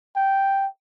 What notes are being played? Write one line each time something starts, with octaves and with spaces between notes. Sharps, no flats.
G5